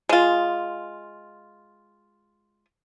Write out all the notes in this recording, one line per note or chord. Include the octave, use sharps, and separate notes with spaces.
G#3 F4